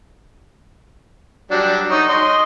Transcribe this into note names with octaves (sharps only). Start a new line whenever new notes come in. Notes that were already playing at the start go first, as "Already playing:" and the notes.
F#3 G3 D4
D#4 C#5
D#5 C6